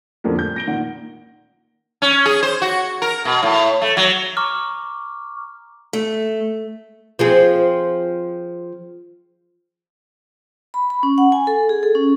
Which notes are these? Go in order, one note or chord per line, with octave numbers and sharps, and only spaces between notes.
F2 A2 D3 F3 G3 A#3
G6
A#6 D7 G7
A#2 D#3 F#5
C#4
G#4
C5
F#4
A#4
B2
A2
A3
F#3
A#5 C#6 D6 F6
A3
F3 C4 G#4
B5
B5
C#4
F#5
G#5
A4
G#4
A4
C#4